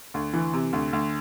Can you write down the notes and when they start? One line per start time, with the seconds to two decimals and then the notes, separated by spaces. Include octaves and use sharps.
0.14 D2
0.33 E3
0.53 C3
0.73 D2
0.93 D2